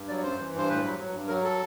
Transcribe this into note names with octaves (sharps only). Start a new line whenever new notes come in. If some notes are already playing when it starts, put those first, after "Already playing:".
Already playing: G2
F#3 D5
F#2 C5
E3
G2 C5
A2 B4
F#3
F#3
G2
F#3 A#4
A4